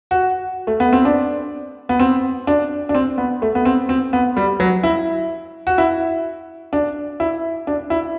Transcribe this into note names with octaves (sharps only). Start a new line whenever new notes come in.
F#4
A3
B3
C4
D4
B3
C4
D4
D4
C4
B3
A3
B3
C4
C4
B3
G3
F#3
E4
F#4
E4
D4
E4
D4
E4